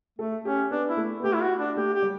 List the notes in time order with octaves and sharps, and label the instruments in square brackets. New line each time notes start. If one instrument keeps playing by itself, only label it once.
[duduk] A3 [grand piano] A4
[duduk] C#4 [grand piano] G4
[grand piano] B3 [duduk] D4
[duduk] E4
[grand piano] A3
B3
[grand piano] A3 [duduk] G4
[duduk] E4
F#4
D4
[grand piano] A3 [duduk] G4
[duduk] G4
[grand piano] G3